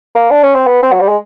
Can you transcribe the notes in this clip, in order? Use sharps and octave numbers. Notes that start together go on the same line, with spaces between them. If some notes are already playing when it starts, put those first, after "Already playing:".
A#3
D4
C#4
C4
B3
C4
F#3
G3
G#3